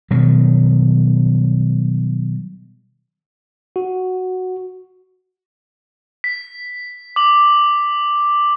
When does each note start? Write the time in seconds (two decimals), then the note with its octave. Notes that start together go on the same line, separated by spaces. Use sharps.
0.11 B2 D#3 F#3 G3
3.76 F#4
6.24 B6
7.16 D6 F#7